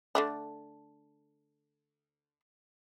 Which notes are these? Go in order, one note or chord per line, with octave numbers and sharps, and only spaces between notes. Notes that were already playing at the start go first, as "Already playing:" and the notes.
D3 A3 D4